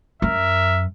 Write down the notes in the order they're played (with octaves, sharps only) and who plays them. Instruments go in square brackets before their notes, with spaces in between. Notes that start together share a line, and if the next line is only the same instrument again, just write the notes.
[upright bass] F#2 [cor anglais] A#4 [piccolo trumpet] E5